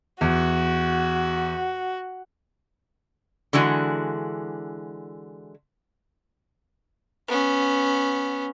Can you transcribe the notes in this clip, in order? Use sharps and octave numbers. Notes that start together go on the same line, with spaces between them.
E2 F#4
D3 E3 G#3 F#4
B3 C#4